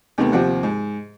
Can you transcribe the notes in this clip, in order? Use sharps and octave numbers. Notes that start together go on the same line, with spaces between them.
D#2 C3 D#3 A3 B3
D#2 C3 F3 F#5
G#2